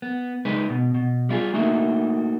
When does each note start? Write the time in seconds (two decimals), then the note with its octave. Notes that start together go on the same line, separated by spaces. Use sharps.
0.02 B3
0.45 C#2 G#3 D#4 B4
0.70 B2
0.94 B2
1.29 G3 E4 F4 G#4
1.54 A3 A#3 D#4 F#4